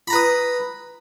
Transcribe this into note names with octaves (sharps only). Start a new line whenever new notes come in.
B4 A#5 B5 D#6